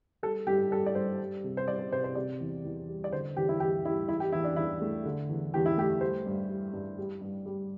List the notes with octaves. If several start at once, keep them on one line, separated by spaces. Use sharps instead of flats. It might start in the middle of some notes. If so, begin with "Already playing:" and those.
G3 A4
G2 G4
G3 A4
D5
G2 C5
G3
C3
C5
G3 D5
C5
C3 C5
C5
C3 D5
E2
E2
G3
D5
D3 C5
E2 G4
E4
E2 G4
G3 E4
E3 E4
G4
E2 E4
D4
E2 E4
A3
D3
E2
E2 G4
E4
A3 G4
G3 C5
G2
G3
G2
G3
G2
G3